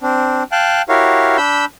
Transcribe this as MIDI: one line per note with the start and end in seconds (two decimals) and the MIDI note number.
0.01 0.43 60
0.01 0.43 62
0.52 0.82 77
0.52 0.82 79
0.52 0.82 81
0.52 0.82 90
0.89 1.37 64
0.89 1.37 66
0.89 1.37 67
0.89 1.37 70
0.89 1.37 73
0.89 1.37 77
1.37 1.65 62
1.37 1.65 83
1.37 1.65 88
1.37 1.65 91